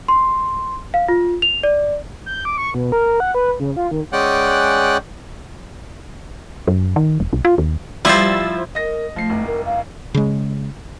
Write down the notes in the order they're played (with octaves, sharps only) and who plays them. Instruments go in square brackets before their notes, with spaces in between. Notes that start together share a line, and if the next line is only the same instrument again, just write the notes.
[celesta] C6
F5
F4
F7
D5
[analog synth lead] G6
D6
C#6
B2
A#4
F#5
B4
C#3
F4
D#3
[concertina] G#3 C#4 D5 F#5 G5 F#6
[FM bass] F#2
D#3
E1
B1
F4
D#2
[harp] F3 [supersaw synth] G3 E6 A6 [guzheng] E4 C5
[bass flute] A#4 [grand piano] D#5 A#6
[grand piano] F3 C7 [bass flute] A3
[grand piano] F1 C2
[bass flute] A#4
F5
[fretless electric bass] C#3 G#3